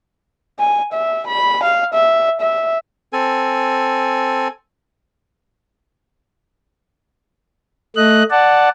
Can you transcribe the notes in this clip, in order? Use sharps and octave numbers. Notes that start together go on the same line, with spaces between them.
G#5
E5
B5
F5
E5
E5
C4 A4 G#5
A3 D#5 F#6
D5 F#5 A5